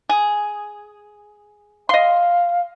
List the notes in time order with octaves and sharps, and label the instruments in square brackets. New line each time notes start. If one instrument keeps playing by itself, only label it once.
[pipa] G#4
[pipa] D#5 C6 [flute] F5